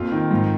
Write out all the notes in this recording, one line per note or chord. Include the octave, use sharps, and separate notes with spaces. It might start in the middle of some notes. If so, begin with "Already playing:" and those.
Already playing: F2 A#2 F4
D#3
G#2